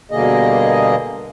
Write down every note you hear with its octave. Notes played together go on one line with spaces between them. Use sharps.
G2 B2 D3 A#3 G#4 D#5